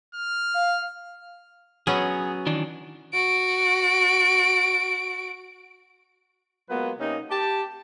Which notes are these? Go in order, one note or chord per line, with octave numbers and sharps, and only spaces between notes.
F6
F5
F#3 B3 C#4 G#4
D#3 E3 D4
F#4 D7
F#3 G#3 A#3 B3 F4 B4
C3 A#3 C#4 D#4
G4 A5